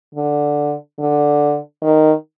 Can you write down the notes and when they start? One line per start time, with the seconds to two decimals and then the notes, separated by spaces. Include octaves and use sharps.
0.15 D3
0.99 D3
1.82 D#3